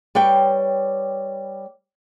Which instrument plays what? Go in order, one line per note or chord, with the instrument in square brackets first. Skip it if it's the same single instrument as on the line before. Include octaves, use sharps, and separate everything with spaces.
[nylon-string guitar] G3 B4 C#5 G5